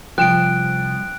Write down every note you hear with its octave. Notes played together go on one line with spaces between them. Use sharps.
C2 F3 G5 F#6 D7 E7